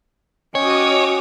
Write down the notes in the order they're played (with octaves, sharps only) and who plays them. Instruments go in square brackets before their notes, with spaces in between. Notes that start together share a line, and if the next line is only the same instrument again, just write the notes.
[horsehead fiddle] C#4 [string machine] F#4 D6 D#6 [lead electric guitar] C#5 [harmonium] D#5 G5 G#5